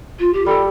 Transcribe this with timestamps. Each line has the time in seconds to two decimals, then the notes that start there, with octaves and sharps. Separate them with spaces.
0.19 F4
0.33 G4
0.46 G3 A4